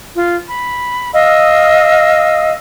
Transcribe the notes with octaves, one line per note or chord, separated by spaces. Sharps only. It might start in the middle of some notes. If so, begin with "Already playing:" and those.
F4
B5
D#5 F5 E6